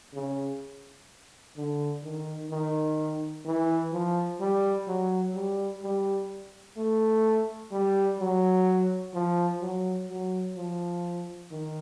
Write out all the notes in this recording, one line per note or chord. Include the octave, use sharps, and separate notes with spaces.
C#3
D3
D#3
D#3
E3
F3
G3
F#3
G3
G3
A3
G3
F#3
F3
F#3
F#3
F3
D#3